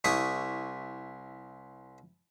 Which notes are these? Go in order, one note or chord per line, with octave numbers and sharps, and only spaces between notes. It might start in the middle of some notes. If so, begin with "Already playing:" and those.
C2 E4 C#6 D#6